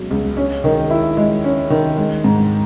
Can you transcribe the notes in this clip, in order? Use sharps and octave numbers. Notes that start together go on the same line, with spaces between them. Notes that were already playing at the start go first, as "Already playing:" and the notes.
Already playing: C#2 B2 F#3 B3
C#2
C#4
D#3
E4
G#3
C#4
D#3
G#3
G#2